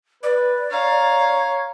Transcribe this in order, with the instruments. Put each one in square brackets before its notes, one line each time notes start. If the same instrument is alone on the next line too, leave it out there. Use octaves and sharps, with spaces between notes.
[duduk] B4 [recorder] D5
[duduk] C#5 [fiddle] F5 A#5